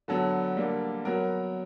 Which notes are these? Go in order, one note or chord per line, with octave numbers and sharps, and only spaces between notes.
D3 F#3 B3 A4
D3 G3 A#3
F#3 B3 A#4